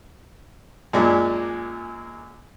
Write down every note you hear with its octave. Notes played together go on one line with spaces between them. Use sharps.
F#2 A#2 G#3 D4 D6